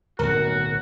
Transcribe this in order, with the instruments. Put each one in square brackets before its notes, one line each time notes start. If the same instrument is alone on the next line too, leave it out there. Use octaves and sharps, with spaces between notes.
[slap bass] D1 B1 [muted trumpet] F#4 [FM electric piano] A#4